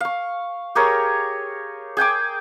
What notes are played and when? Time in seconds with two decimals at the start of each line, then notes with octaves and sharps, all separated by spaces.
0.01 F5 C#6
0.75 G4 G#4 A#4 C#5
1.97 G#4 G5 G#5 D6